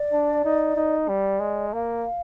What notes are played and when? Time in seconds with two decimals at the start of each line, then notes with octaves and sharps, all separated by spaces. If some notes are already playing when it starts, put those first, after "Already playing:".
Already playing: D5
0.13 D4
0.45 D#4
0.76 D#4
1.09 G3 D5
1.40 G#3
1.73 A#3 F5